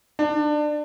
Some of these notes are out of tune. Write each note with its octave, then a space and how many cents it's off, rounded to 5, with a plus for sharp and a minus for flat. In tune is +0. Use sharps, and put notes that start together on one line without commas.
D4 +25